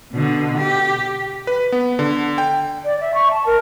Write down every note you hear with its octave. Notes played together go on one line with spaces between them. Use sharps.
B2 D3
G4
B4
B3
D3
G5
D5
E5
C#6
A5
A#4